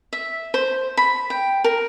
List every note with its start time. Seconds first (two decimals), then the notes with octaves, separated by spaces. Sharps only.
0.13 E5
0.54 C5
0.97 B5
1.30 G5
1.64 A#4